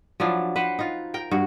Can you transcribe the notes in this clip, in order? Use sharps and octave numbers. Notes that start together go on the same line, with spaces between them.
F3 F#3 D4 E4
B4 C5 F#5
D#4 F4
A#4 G5
G2 F#4